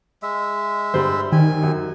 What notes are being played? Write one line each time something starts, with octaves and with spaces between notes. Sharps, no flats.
G#3 E5
G2 D3 G3 C5
D#3 G4 G#5
F#2